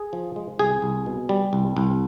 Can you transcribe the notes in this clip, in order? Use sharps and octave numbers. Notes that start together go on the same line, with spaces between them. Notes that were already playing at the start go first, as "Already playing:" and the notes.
Already playing: G#4
F3
G#3
C2 G#4
C2
B2
G3
C2
C2